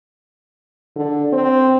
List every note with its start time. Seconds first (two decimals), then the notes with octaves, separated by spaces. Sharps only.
0.96 D3
1.33 C4